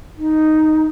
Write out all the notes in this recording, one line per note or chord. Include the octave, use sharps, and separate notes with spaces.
D#4